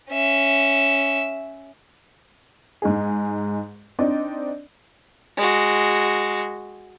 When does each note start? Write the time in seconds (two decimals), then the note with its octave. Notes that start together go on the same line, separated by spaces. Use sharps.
0.11 C#4 E5
2.82 G#2 D#4 G#4
3.99 C4 D4 D#4 D5
5.37 G#3 F#4